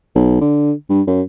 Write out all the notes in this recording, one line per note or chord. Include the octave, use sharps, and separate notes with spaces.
B1
D3
G2
F#2